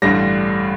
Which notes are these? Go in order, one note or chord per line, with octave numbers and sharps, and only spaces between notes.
A1 G2 D3 G3 A#6